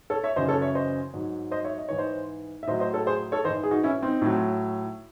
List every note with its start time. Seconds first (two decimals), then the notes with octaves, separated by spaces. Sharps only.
0.10 A4 C#5
0.24 C#5 E5
0.36 F#2 C#3 E3 C5 D#5
0.49 A4 C#5
0.62 C#5 E5
0.75 C5 D#5
1.14 G#2 F#3
1.51 C5 D#5
1.64 C#5 E5
1.78 D#5
1.89 G#2 E3 C#5
1.98 C5 D#5
2.63 E5
2.67 A2 F#3 C5 D#5
2.80 C5 D#5
2.94 A4 C#5
3.06 G#4 C5
3.32 A4 C#5
3.44 E3 C5 D#5
3.49 G#2
3.63 G#4
3.71 D#4 F#4
3.83 C#4 E4
4.03 C4 D#4
4.22 A2 F#3